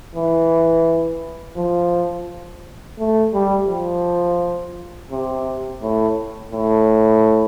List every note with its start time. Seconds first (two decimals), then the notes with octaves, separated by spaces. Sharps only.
0.15 E3
1.57 F3
2.98 A3
3.33 G3
3.68 F3
5.11 C3
5.82 A2
6.52 A2